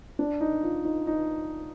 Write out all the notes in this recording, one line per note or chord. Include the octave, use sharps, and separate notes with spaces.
D4
D#4
F4
D#4
D#4